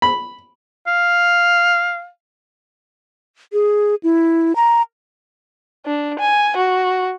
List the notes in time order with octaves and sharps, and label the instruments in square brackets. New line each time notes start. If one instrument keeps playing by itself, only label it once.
[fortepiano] B5
[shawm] F5
[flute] G#4
E4
A#5
[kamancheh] D4
G#5
F#4